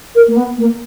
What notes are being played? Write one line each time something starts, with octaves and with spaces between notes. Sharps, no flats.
A#4
A#3
B3
A#3